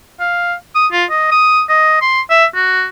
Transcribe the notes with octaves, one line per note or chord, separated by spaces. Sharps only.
F5
D#6
F4
D#5
D#6
D#5
C6
E5
F#4